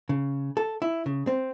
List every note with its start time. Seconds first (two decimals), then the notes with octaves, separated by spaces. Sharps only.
0.09 C#3
0.57 A4
0.82 E4
1.06 C#3
1.27 C4